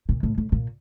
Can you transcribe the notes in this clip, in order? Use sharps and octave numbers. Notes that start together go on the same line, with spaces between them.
A#2
A2
A2
A#2